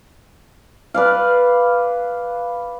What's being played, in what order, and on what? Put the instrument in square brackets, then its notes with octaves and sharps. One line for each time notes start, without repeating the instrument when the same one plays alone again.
[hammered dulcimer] B4 D5 F5